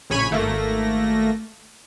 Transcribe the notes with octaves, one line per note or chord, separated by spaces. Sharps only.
A#1 C#3 C#5 G#5 B5 D#7
G#1 A3 A#3 A#6